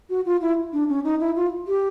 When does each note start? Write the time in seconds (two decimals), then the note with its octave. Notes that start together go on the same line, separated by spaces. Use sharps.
0.10 F#4
0.25 F4
0.41 E4
0.73 D4
0.89 C#4
1.04 D#4
1.20 E4
1.36 F4
1.68 G4